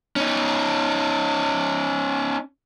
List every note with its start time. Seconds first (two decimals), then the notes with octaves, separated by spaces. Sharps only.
0.16 C#4 D#4